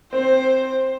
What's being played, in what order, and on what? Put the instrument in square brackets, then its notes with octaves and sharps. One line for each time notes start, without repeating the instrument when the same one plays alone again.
[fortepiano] C4 [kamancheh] C5